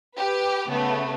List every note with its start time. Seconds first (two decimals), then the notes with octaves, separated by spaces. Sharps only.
0.17 G4 B4
0.69 C#3 A3 B3